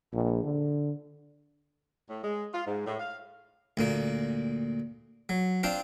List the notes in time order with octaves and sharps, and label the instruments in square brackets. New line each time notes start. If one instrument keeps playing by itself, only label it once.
[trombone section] A#1
D3
[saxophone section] A2
G#3
F4
G#2
A2
F5
[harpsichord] D2 A#2 A#3
F#3
C4 D4 F4 C5